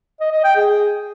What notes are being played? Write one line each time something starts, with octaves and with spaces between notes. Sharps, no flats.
D#5
D#5
G5
G#4